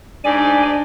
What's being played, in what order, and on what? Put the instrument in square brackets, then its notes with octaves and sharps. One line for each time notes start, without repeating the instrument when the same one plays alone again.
[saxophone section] G#2 D5 [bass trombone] D4 [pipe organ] G#5